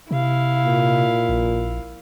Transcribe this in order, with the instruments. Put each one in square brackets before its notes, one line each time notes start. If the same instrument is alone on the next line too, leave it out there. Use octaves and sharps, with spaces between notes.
[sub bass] C3 [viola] E4 F5
[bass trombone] A#2
[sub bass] A#1